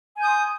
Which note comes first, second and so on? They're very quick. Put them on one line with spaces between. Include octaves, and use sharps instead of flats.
G#5 G6 D#6 C6